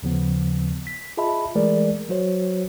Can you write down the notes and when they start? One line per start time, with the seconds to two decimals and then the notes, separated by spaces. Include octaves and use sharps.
0.02 D#2 C#3 F3 B3
0.87 B6
1.17 F4 G#4 D#5 E5 A5 B5
1.55 E3 G#3 A3 G#4 A#4 D5
2.09 F#3 F#4 C5 C#5